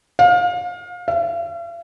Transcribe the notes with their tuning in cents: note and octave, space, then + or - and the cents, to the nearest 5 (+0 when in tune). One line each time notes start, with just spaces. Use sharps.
F5 +30
F5 -45